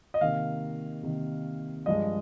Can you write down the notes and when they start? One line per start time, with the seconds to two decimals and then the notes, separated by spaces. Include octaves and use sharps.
0.14 D#5
0.21 C3 D#3 A#3 F5
1.03 C3 D#3 A#3
1.86 G2 F3 G#3 D#5